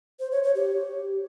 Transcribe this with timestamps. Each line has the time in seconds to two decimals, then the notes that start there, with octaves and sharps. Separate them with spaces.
0.20 C5
0.31 C#5
0.43 C#5
0.55 G4